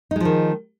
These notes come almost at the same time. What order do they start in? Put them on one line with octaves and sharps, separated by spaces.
D#4 G#3 F3 D#3